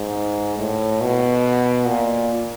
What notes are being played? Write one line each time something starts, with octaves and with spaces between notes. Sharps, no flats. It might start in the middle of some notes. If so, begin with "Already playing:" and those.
Already playing: G#2
A2
B2
A#2